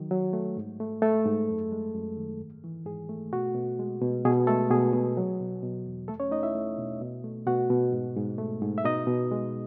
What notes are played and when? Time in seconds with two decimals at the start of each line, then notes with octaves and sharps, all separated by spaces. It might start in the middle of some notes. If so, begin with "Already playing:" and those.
Already playing: D#3 F#3
0.11 F#3
0.33 A3
0.57 G#2
0.80 A3
1.02 A3 A4
1.25 G#2
1.49 F#2
1.72 G#3
1.95 F#2
2.17 D#3
2.40 G#2
2.64 E3
2.86 G#2 G#4
3.09 A3
3.33 B2 F#4
3.55 B2
3.79 G#3
4.02 B2
4.25 B2 G#4
4.47 G#3 A3 A4
4.71 B2 G#4
4.93 B2
5.17 F#3
5.40 B2
5.63 B2
5.86 E2
6.08 A3 A4
6.20 C#4 C#5
6.31 A3 D#4 D#5
6.43 E4 E5
6.55 A3
6.78 B2
7.01 B2
7.24 A3
7.46 B2 F#4 F#5
7.70 B2
7.92 G#2
8.16 G#2
8.38 A3
8.62 G#2
8.78 E5
8.85 B2 D#4 D#5
9.07 B2
9.31 G#3